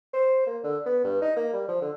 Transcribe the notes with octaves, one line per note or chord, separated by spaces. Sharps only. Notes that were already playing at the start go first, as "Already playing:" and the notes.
C5
A#3
D3
B3
G2
D#4
A#3
G3
F3
D3